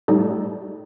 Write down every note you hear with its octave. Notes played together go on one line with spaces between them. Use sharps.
A2 G3 D#4 A4